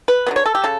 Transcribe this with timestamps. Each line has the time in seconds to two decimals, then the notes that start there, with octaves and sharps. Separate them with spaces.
0.08 B4
0.27 D3 F#3 B3
0.36 C#5
0.46 A4
0.55 G4
0.64 C#3 A4